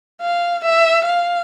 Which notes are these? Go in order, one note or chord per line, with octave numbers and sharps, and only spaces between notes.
F5
E5
F5